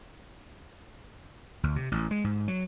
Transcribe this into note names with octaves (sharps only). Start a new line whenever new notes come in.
D2
C3
A1
G#3
G#2
F#3